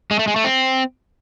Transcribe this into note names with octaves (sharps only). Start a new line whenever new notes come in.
G#3
A3
G#3
A3
C4